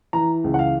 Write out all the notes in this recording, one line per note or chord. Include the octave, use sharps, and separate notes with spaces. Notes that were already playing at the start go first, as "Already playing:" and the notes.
E3 A#5
C#2
F#5
F5